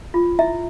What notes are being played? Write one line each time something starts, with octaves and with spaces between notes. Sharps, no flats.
F4
E4 E5